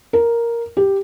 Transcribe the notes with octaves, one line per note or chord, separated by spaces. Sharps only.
A#4
G4